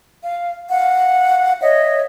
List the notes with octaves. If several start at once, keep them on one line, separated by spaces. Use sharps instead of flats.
F5
F5 F#5
C#5 D#5 E5